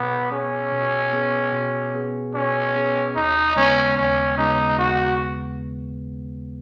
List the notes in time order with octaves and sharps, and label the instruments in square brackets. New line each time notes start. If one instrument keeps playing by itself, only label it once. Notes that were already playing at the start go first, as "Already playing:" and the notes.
Already playing: [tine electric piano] B2 [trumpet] B3
[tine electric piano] B3 G#4 [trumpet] C#4
[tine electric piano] B2
B3 G#4
B2
B3 G#4
[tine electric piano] B2 [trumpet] C#4
[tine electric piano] B3 G#4
[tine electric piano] D#2 [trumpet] D#4
[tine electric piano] C#3 G#3 B3 [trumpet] C#4
[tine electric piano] D#2 [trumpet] C#4
[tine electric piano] C#3 G#3 B3 [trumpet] D#4
[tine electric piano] D#2 [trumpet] F#4